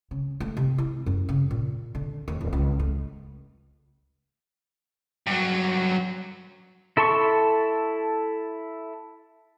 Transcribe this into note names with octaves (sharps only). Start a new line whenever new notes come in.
C#3
A3
C3
E4
F#2
C#3
A#2
D3
D#2
D1
C#2
A3
G2 F#3
E4 A4 A5 C6 C#6